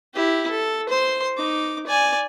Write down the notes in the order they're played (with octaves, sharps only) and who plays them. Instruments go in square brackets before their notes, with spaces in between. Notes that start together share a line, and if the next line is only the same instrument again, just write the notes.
[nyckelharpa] E4 G4
A4
C5 C6
D#4 D6
D5 G#5